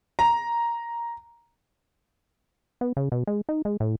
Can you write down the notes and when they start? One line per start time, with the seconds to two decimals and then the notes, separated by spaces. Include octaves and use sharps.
0.19 A#5
2.81 B3
2.97 C#3
3.12 B2
3.27 G#3
3.49 D#4
3.65 G#3
3.80 A2